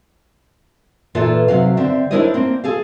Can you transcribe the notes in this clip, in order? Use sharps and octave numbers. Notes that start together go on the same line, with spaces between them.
A#2 E3 F4 A4 B4 E5
C3 F#3 F5
D3 C4 E5
D4 E4 A#4 C5 C#5 D#5
A#3 C4
G#4 A4 F5